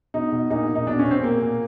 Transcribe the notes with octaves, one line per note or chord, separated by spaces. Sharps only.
B2 D#4
B2
A#2 D#4
A#2
D#4
B2 D4
C#4
B2
C4
A#2 A#3
A#2